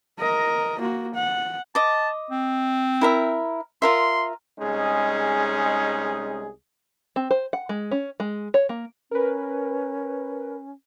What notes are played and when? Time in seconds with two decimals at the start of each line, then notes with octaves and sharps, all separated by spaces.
0.19 A#4 D#5
0.80 A#3 F#4
1.15 F#5
1.75 D#5 A5 D6
2.31 C4
3.01 E4 A#4 E5
3.82 F4 A#4 E5 C6
4.59 C2 G#3 C#4 D#4 G#4
7.16 C4
7.31 C5
7.53 F#5
7.69 G#3
7.91 C#4
8.20 G#3
8.54 C#5
8.69 A#3
9.11 C#4 A#4 B4